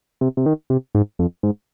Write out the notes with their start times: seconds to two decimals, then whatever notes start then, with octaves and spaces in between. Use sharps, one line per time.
0.21 C3
0.37 C3
0.46 D#3
0.70 C3
0.95 G#2
1.19 F2
1.43 G#2